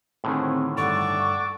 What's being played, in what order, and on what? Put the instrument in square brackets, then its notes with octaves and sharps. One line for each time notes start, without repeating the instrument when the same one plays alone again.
[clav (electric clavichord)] A2 D3 D#3 [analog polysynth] C4 G#4
[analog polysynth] G2 [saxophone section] A4 D5 F#5 [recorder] C#6